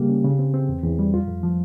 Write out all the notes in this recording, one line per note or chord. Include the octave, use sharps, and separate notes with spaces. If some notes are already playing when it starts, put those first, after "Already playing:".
Already playing: C#3 G3 A#3 G4
C#4
C#3
C4
C4
E2
E2
G3
F2 F4
F2
F3